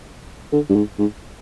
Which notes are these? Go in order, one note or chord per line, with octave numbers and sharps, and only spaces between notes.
D3
G2
G#2
G#2